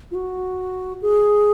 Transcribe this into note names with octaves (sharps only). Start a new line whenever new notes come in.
F4
F#4
G#4